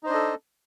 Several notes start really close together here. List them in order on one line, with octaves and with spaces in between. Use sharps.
D#4 C5 D4 D#5 A4